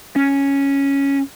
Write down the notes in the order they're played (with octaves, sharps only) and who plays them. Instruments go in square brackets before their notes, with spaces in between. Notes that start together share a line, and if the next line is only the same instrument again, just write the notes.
[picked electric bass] C#4